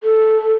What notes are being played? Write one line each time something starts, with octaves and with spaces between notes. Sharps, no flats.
A4